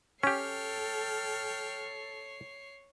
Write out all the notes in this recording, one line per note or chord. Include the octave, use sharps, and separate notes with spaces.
C#4 G4 A4 C#5 G5 F6 C7